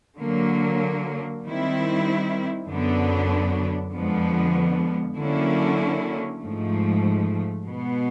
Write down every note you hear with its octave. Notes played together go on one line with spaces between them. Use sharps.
D3 F#3 A#3
D#3 G3 C4 E4
F#2 D3 F#3 B3 D4
F2 D3 F3 G#3 B3
D3 F#3 A#3 C#4 E4
G#2 F3 A3
B2 G#3 B3